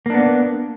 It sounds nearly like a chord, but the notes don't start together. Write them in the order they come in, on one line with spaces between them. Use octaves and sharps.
A#3 D4 B3